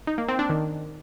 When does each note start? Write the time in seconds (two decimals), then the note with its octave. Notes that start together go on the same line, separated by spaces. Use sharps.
0.07 D#4
0.18 A#3
0.28 C4
0.39 D4
0.49 D#3